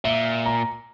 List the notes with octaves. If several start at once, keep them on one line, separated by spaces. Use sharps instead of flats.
A#2 E5
A#5